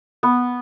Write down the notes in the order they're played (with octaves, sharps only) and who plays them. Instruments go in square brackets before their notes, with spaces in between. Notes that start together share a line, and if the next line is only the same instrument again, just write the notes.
[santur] B3